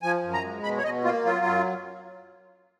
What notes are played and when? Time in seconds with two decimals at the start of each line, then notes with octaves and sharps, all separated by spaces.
0.02 F3 G#5
0.23 F#2
0.34 A#5
0.43 G#3
0.63 B2 B5
0.78 C#5
0.84 B2 D#5
1.04 A#3 F4
1.25 F#3 F4
1.45 F#2